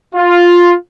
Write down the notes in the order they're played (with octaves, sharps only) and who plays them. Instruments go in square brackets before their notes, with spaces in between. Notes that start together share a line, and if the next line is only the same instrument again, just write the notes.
[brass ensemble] F4